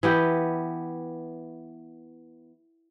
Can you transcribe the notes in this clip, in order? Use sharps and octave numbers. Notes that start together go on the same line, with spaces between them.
E3 B3 G4 G5